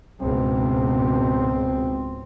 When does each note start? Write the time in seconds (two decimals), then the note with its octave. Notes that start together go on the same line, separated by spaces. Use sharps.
0.22 C#2 G#2 B2 C4